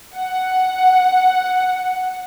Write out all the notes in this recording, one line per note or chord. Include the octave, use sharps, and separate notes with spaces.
F#5